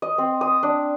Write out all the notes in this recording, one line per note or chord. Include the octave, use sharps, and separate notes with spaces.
D#5
C4
D#6
D4